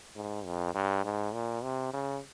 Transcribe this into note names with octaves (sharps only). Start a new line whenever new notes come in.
G#2
F2
G2
G#2
A#2
C3
C#3